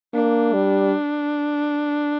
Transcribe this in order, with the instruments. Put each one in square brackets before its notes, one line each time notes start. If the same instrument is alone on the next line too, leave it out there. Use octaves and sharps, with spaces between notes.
[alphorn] A#3 [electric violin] D4
[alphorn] G3